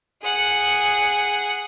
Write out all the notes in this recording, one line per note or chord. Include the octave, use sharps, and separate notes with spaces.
G#4 F#5